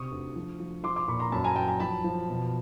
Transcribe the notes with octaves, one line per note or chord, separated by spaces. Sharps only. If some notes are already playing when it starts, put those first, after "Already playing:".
Already playing: C3 C#6 D#6
D2
F3
F3
F3 C6 D6
C6 D6
A#2 B5 C#6
A#5 C6
F#2 A5 B5
G#5 A#5
F#3 G5 A5
G#5 A#5
F3 A5 B5
F3
B2